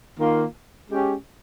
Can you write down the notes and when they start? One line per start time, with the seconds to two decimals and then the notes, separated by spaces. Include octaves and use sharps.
0.18 D#3 A#3 F4 A#4
0.89 G#3 C#4 G4